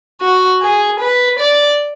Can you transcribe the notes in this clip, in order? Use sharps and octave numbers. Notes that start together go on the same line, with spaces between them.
F#4
G#4
B4
D5